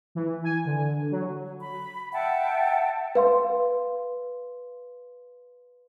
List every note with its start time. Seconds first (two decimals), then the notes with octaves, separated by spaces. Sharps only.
0.15 E3
0.44 G#5
0.65 D3
1.11 F#3
1.58 B5
2.11 E5 F#5 G5 A5
3.15 B4 F5 C6